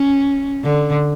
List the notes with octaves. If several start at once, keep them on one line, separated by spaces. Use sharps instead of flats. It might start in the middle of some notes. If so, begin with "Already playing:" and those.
Already playing: C#4
D3